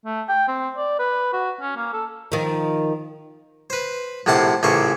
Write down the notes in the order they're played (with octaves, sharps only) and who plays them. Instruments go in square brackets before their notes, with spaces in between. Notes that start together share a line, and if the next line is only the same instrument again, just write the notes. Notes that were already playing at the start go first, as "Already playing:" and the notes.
[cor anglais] A3
G5
C4
D5
B4
F#4
C#4
A#3
A4
[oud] D#3 F3
[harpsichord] B4 C5
A#1 A2 C3 F#5 A5 C6
A1 A#2 C#3 C5 C#6